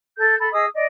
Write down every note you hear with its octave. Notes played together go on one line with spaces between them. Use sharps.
A4 G6
A4 B5
G#4 D#5 D#6 E6
D5 D#5